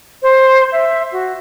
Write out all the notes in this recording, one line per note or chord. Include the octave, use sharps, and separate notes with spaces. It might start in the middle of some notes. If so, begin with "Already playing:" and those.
C5
E5
F#4